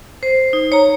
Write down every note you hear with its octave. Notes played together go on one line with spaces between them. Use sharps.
C5
D#4
C#5 A#5